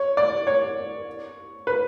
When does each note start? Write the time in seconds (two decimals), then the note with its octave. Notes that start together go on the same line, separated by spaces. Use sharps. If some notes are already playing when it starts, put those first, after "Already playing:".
Already playing: C#5
0.17 D5
0.47 C#5
1.67 B4